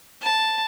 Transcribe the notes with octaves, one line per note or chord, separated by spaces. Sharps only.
A5